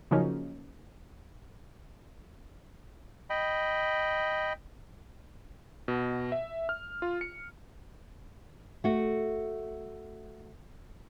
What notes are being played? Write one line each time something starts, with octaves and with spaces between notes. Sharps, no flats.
C#3 F3 F#3 A#3 C#4 D#4
D#5 G5 B5
B2
E5
F6
F4
C#7
A3 F#4